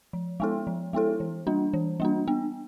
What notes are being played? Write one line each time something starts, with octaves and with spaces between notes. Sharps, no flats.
F3
G#3 B3 E4 A4
F3
G#3 B3 E4 A4
E3
G3 A#3 D4
E3
G3 A#3 D4
B3